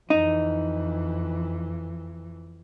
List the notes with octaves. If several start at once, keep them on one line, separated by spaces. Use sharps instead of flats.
F2 E3 D#4